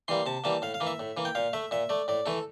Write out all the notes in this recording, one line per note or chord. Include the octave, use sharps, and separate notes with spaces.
E3 G3 A#3 C6
C3 A5
E3 G3 A#3 A5
A2 F5
F5
E3 A#3
E5
A2
E3 A#3
G5
A#2 F5
A3 E5
A#2 E5
A3 D5
A2 D5
E3 A3 A4